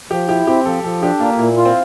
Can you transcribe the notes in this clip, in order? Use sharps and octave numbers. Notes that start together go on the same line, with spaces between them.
F3 G4
E4 G4
C4 G4
F3 A4
F3 A4
D4 G4
A#3 F4
A#2 E4
F4
C4